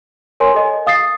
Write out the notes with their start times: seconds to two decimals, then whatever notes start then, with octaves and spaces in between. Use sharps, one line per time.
0.40 A#4 C#5 G#5 C6
0.54 A4 D#5 G#5
0.86 F5 D#6 A6 C7